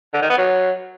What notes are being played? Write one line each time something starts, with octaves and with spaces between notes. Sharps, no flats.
D3
D#3
B3
F#3